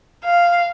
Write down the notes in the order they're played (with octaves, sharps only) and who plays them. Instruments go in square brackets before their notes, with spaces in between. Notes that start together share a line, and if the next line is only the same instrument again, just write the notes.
[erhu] F5